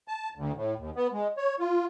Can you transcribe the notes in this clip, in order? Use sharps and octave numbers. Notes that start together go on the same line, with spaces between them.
A5
D2
A2
D#2
B3
G#3
C#5
F4